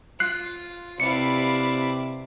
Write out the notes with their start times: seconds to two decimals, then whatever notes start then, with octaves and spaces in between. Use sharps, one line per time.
0.20 F4 F#6 C7
1.00 C3 E4 B4 D5 F5 C#7